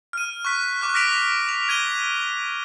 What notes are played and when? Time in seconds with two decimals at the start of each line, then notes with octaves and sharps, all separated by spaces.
0.13 F6 D#7
0.45 C#6 F#6 B6
0.81 C#6 D6 F#6
0.94 D6 F6 A#6 B6 D7 F7
1.49 F7
1.69 G#6 D#7 G7